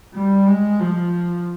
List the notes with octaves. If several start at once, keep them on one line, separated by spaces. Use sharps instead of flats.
G3
G#3
F3